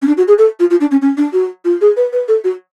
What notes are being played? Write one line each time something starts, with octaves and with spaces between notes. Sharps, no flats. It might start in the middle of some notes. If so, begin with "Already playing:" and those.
C#4
D4
F#4
G#4
A4
F4
F4
D4
C#4
C#4
D4
F#4
F4
G#4
B4
B4
A4
F#4